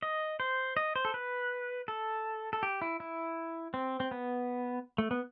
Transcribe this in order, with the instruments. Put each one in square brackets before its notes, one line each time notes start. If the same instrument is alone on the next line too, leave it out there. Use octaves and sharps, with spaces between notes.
[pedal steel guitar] D#5
C5
D#5
C5
A4
B4
A4
A4
G4
E4
E4
C4
C4
B3
A3
B3